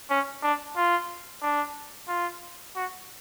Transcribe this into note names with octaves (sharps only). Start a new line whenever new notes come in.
C#4
D4
F4
D4
F4
F#4